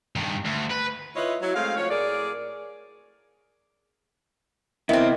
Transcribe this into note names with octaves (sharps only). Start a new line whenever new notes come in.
G2 D#3
D2
B4
E4 F4 B4 C#5 D#5 E5
F#3 E4
G#3 A3 C4 F5
F3 A3 F#4 C#5
A2 G#4 A#4 D5
C3 D#3 B3 C4 E4